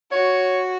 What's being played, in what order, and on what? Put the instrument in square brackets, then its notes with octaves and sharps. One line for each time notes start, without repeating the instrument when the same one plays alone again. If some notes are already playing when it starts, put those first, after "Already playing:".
[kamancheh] F#4 [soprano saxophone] C#5